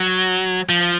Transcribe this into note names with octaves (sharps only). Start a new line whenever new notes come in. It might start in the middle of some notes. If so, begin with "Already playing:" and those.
Already playing: F#3
F3